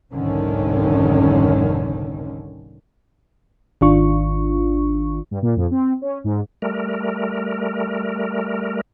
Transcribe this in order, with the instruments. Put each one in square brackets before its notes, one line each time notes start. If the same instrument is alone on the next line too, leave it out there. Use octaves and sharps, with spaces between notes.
[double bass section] F1 C2 G#2 D3 D#3 C#4
[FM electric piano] G#1 D#3 D4 F4 C#6
[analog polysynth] G2
A#2
F2
C4
C#4
G#2
[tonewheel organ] G3 A3 A#4